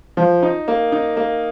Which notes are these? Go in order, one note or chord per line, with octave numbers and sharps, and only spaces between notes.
F3
D#4
A#3
D#4
A#3